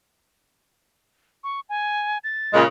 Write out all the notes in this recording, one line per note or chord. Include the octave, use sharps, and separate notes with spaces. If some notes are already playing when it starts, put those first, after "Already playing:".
C#6
G#5
A6
A#2 C#3 G#3